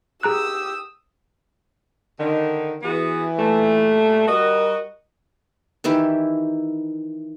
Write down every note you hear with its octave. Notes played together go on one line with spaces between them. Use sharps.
G4 G#4 A#5 D#6 E6 F#6
D3 D#3
E3 B3 F#4 G#4
A#2 G3 A3
G3 F#4 A#4 D#5
D#3 E3 E4 G4